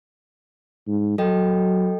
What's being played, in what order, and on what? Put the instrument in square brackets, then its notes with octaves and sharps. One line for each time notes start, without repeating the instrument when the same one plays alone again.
[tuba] G#2
[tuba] F#3 [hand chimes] A4 D#5 G5